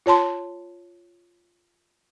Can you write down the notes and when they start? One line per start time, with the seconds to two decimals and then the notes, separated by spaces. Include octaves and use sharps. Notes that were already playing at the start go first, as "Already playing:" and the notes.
0.06 F4 C#5 A5 C6